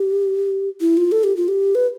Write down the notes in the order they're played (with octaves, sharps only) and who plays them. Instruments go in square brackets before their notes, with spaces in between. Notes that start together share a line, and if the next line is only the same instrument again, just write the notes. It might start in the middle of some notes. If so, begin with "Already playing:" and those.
Already playing: [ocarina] G4
E4
F4
A4
G4
F4
G4
B4